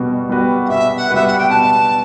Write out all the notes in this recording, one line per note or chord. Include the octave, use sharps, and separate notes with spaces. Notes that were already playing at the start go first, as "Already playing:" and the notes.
Already playing: B2 G3 B3 F#4
G3 B3 F#4 B4
F#5
B2 E5
F#5
G3 B3 F#4 B4 E5
F#5
G5
B2 A5